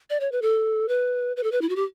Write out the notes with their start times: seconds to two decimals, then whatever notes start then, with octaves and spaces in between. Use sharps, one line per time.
0.10 D5
0.20 C#5
0.32 B4
0.42 A4
0.88 B4
1.37 B4
1.43 A4
1.52 B4
1.61 E4
1.69 F#4
1.76 G4